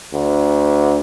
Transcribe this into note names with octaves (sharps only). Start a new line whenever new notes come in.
D2